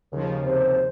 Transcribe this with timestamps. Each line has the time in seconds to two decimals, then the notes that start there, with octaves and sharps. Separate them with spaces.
0.12 D#2 C#3 F3
0.43 C3 C5